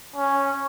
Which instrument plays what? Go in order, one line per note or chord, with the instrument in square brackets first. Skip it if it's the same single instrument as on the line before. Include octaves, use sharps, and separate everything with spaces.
[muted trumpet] C#4